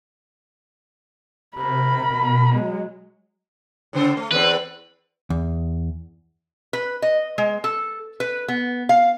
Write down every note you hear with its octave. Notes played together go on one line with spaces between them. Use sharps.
C3 A#4 B5
B2
F#3 G#3
A2 C#3 C5
A3
E2 C4 B4
E2
B4
D#5
G#3
A4
B4
B3
F5